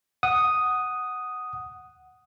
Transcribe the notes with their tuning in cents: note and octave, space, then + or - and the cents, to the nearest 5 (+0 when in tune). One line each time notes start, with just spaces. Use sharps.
F#5 +0 D#6 +0